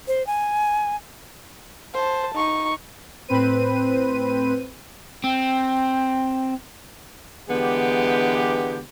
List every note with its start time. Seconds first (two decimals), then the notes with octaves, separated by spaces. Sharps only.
0.08 C5
0.27 G#5
1.94 C5 A5
2.35 D#4 C#6
3.28 A2 C4 B4 C5 D#7
5.24 C4 G5
7.50 D3 E3 G#3 B3 G4